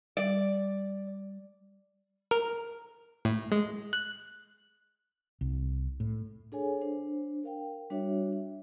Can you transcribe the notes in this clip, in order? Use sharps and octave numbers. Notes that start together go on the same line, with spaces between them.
G3 D5
A#4
A2
G#3
F#6
C2
A2
D4 G#4 A4 C#5 G#5
D4 C5
A#4 F5 G5
G3 D4 F#4 C#5 E5
E5